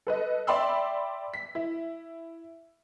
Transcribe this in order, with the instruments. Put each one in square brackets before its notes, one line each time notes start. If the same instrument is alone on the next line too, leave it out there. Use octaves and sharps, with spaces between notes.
[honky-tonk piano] A4 B4 D#5
D5 E5 G5 B5 C6 E6
B6
E4